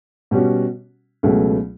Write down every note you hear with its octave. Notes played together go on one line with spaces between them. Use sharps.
B2 G3 C#4 F#4
C#2 B2 F#3 A3